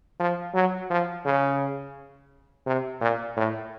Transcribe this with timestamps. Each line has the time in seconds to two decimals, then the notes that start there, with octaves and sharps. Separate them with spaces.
0.20 F3
0.54 F#3
0.90 F3
1.25 C#3
2.67 C3
3.01 A#2
3.37 A2